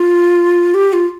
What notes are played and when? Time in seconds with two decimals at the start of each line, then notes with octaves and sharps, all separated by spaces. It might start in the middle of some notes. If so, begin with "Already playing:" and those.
Already playing: F4
0.74 G4
0.93 F4